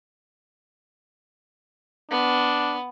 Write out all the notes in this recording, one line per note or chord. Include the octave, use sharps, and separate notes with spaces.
B3 D4